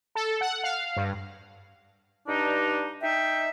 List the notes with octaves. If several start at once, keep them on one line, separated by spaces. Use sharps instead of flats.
A4
F#5
F5
G2
G2 D4 D#4
D#4 E5 G5